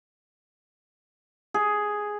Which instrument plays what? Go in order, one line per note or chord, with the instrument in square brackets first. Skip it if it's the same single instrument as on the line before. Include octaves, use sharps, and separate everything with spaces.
[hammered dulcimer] G#4